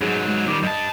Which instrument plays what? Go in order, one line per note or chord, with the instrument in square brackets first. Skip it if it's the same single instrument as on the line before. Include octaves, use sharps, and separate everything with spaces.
[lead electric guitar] G#2 F#3 [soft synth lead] G#4
[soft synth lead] G#3
[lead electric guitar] D#3 G3 [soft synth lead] D6
[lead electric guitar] G2 A5 [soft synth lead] D#5